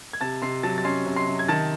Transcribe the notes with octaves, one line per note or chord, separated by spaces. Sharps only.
G#6
C3 A5 A6
C3 C6 C7
F#3 A5 A6
A6
C#4 C6 C7
C3
C6 C7
C3
G#6
D#3 A5 A6